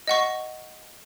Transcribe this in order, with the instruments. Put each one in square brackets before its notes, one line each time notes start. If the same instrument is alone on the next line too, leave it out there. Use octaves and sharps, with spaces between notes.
[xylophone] D#5 F#5 C#6